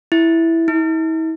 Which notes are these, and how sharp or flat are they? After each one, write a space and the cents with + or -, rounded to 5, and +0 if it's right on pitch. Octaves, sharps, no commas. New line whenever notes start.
E4 +0
E4 -45